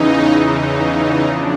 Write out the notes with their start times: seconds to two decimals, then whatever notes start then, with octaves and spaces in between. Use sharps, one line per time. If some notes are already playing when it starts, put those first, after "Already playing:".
Already playing: E2 C#3 E3 D#4
0.34 D#4
1.23 E2 C#3 F3 D4